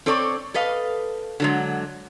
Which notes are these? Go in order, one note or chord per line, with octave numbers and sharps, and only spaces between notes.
C4 A4 C#5 D5
A4 B4 D#5 F5
D3 F#3 G#3